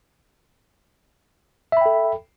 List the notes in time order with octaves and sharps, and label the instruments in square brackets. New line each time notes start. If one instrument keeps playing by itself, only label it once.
[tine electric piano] E5
B5
G5
A4